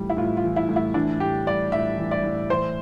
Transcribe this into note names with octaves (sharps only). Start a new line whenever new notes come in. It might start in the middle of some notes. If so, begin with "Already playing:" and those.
Already playing: A2 E3 G3
E4
A2 F4
F4
E3
E4
A2
E4
E3 D4
A2 G4
G3 D5
A2 E5
E3
D5
A2
E3 C5